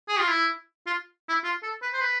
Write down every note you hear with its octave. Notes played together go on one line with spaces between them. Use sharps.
G#4
F4
E4
F4
E4
F4
A4
B4
C5
B4